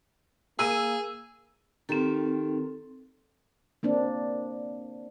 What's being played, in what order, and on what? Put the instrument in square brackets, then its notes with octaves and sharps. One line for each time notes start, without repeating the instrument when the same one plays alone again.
[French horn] A#3 [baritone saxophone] G#4 [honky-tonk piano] E6 D#7
[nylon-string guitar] D#3 G4 [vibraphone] C4 A4
[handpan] A#3 C4 D4